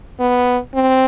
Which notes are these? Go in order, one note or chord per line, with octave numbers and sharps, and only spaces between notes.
B3
C4